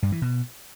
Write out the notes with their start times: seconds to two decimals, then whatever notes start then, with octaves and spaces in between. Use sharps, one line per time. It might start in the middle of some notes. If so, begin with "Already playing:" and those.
0.03 G2
0.12 E3
0.22 B2